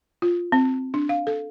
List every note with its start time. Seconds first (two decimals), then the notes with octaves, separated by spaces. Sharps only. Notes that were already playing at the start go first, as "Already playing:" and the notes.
0.22 F4
0.52 C4
0.94 D4
1.09 F5
1.27 A4